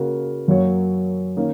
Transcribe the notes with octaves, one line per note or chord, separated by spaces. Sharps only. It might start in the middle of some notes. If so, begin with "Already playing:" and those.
Already playing: C#3 A#3 F#4 A#4
F#2 F#3 A#3 F#4 C#5
D#3 A#3 C#4